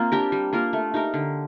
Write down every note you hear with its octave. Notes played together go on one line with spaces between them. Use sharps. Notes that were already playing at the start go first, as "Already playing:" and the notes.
Already playing: A#3 C4 F4
D4 G4 A#4
G3
A#3 F4 A#4
A3
D#4 G4 A#4
D3